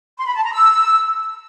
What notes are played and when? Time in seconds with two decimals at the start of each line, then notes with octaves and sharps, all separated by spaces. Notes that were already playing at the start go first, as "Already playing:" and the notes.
0.19 C6
0.27 B5
0.36 A5
0.45 A#5
0.53 E6